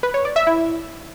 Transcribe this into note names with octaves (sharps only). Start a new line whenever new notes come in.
B4
C#5
D5
E5
E4